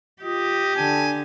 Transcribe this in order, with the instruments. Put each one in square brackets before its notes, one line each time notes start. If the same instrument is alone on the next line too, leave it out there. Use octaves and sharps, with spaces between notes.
[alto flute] F4 [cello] G4 [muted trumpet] D#5
[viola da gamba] D3 [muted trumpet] G#5 [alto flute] A5